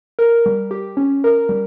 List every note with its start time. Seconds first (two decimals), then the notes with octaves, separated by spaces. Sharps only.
0.19 A#4
0.46 G3
0.71 G4
0.97 C#4
1.24 A#4
1.49 G3